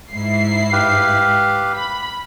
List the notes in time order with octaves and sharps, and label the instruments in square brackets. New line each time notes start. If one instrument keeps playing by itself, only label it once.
[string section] G#2 E4 C7
[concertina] G4 B4 F5
[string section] B5